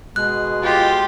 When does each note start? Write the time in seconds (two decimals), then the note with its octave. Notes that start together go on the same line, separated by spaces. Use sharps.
0.16 B2 G#3 F#6
0.63 F4 G4